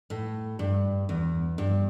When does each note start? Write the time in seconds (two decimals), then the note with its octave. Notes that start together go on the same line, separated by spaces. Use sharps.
0.10 A2
0.59 G2
1.09 E2
1.58 G2